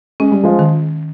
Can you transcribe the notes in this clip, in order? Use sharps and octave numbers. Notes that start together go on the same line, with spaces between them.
G#3 C#4
G3
F3 G#3
D#3